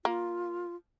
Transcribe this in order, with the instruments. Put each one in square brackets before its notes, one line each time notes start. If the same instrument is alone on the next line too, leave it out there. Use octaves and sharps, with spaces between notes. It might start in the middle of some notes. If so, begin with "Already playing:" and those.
[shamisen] A#3 [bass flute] F4